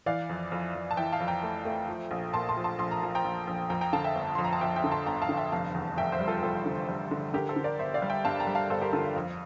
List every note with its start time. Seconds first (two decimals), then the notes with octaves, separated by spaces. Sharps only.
0.06 E3 D5 F5
0.29 F2
0.52 F2
0.75 F2
0.91 A5
0.97 E3 E5 G5
1.12 F5 A5
1.20 F2
1.27 G5 A#5
1.43 A3
1.65 A3
1.88 F3
2.11 A#1
2.34 A#2 A5 C6
2.49 A5 C6
2.57 F3
2.64 A5 C6
2.79 A#1 C6
2.91 A#5
3.02 F3 A5
3.15 G5 A#5
3.24 A#1
3.47 A#1
3.70 F2 G5 A#5
3.81 G5 A#5
3.93 D3 F5 A5
4.04 E5 G5
4.15 G1
4.35 F2 C6
4.44 A#5
4.53 A5
4.61 F2 E5 G5
4.76 E5 G5
4.84 D3
4.92 A5 C6
5.06 G1 G5 A#5
5.22 F5 A5
5.29 D3
5.37 E5 G5
5.52 F1 F5 A5
5.75 E2
5.97 F1 E5 G5
6.12 C5 E5
6.20 G3
6.28 F4 A4
6.43 F1 F4 A4
6.66 D3
6.89 G3
7.11 D3
7.34 D3 G4 A#4
7.49 A4 C5
7.56 D3
7.64 A#4 D5
7.79 G1 C5 E5
7.94 D5 F5
8.02 G3
8.10 E5 G5
8.25 G2 F5 A5
8.40 G5 A#5
8.47 G3
8.55 F5 A5
8.70 G1 A4 C5
8.82 G4 A#4
8.93 D3 F4 A4
9.04 F4
9.16 F2